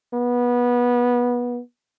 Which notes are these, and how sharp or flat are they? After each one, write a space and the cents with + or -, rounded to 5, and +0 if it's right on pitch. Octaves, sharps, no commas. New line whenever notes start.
B3 -20